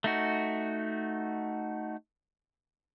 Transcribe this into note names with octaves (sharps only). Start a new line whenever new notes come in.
A3 D#4 F#4